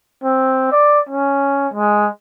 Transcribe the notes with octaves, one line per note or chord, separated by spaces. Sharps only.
C4
D5
C#4
G#3